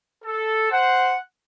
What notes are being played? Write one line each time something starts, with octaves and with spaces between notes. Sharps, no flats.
A4
C5 F#5